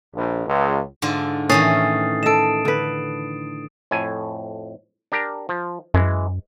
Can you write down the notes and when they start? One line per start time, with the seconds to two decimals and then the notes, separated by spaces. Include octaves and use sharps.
0.15 A#1
0.47 C#2
1.02 G#2 D3 F4
1.49 A2 D#3 E3 C#4 D#6 A6 C7
2.23 A4 D#5 D7 E7
2.65 D3 B4
3.91 F2 A2 G#5
5.12 D4 G4 A#4
5.49 F3
5.94 F#2 E3 G#3